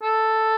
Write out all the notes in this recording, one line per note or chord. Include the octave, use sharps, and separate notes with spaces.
A4